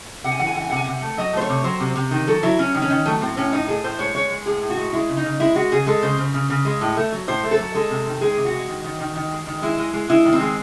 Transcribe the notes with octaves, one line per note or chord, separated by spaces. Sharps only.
C3 F#5
G#5
E3 F#5
G#5
E3 F#5
G#5
C3 F#5
G#5
C3 F#5
A3
F#3 D#5
A3 C5
C#5
C3
F#3 C5
C3
C3
D#3
F#3 A4
F#3 E4
F#3 C#4
D#3
C#4
D#3
F#3 A3
A2 C4
A2 C#4
A2 D#4
A3 G#4
A2 C5
G#3 C#5
G#3 C#5
G#3
A2 G#4
A2
F#4
G#3
G#3 E4
C#3
D#4
C#3
G#3 E4
G#3 F#4
C#3 G#4
G#3 A4
C#3 C5
C#3
C#3
C#3
G#3
A2
A3
F#3
A2 C5
A3
A4
F#3
G#3 A4
C3
D#3
G#3 G#4
C3
F#4
G#3
D#3
D#3
D#3
D#3
G#3
D#3
G#3 E4
G#3
G#3
G#3 E4
D#3
C4
G#3